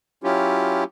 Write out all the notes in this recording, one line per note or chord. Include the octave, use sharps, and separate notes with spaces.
F#3 C#4 E4 F4 G4